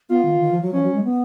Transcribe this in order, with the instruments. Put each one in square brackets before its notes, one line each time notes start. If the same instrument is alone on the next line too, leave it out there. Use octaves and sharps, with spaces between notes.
[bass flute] B3 [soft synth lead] F4
[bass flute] D#3
D#3
F3
F#3
[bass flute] F3 [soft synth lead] C#4
[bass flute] F#3
G#3
B3